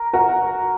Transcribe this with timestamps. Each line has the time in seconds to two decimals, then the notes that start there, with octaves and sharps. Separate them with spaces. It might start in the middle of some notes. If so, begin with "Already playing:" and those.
Already playing: A#4
0.13 F#4 A#4